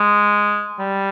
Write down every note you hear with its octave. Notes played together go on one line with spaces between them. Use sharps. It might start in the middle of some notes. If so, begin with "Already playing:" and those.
Already playing: G#3
G3